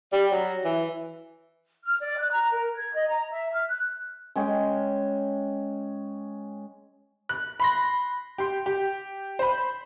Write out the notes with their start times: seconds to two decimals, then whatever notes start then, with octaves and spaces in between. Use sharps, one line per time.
0.13 G3
0.31 F#3
0.65 E3
1.84 F6
2.01 D5
2.17 F#6
2.31 A#5
2.51 A#4
2.75 G#6
2.93 D#5
3.08 A#5
3.30 E5
3.52 F6
3.68 F#6
4.36 G#3 C#4 C#5 G5
7.29 F#6
7.60 B5 C6 A#6
8.38 G4 C6
8.66 G4
9.39 C5 B5